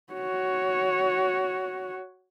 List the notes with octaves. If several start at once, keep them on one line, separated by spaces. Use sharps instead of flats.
F#4 C#5